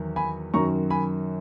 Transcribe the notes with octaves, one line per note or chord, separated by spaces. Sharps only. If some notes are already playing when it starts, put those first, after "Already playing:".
Already playing: E2 D#3 F#3
G#5 B5
F#2 D#3 F#3 A#5 C#6
G#5 B5